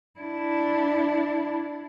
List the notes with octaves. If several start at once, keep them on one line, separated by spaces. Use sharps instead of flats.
D4 E4